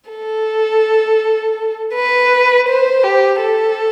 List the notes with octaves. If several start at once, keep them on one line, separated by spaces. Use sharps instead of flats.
A4
B4
C5
G4
A4